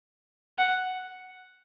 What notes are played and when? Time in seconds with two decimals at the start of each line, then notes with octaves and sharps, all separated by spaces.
0.58 F#5